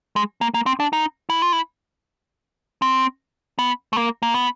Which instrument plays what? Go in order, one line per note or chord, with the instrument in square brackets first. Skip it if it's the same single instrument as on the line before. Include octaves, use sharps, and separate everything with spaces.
[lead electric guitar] G#3
A#3
A#3
C4
D4
D#4
E4
F4
E4
C4
B3
A3
A#3
A#3
B3